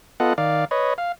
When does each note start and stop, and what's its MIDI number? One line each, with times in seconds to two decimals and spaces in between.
0.20 0.33 59
0.20 0.33 65
0.20 0.33 69
0.20 0.33 75
0.20 0.33 78
0.38 0.65 51
0.38 0.65 74
0.38 0.65 77
0.71 0.94 71
0.71 0.94 73
0.71 0.94 75
0.98 1.12 77